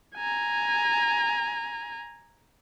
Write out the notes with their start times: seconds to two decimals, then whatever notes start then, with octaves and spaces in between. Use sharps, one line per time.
0.15 G#5 A#5